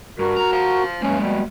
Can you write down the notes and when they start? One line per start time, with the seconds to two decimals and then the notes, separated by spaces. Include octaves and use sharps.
0.19 G2 F#4 A#4
0.37 A#5
0.53 C5 F5
1.02 G2 G#3 A#3 C#4
1.19 B2 G3